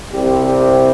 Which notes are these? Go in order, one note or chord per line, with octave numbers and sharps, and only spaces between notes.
C2 C3 G3 C4 G4
G4